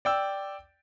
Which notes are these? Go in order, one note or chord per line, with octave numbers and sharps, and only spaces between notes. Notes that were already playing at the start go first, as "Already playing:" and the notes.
D5 G5 E6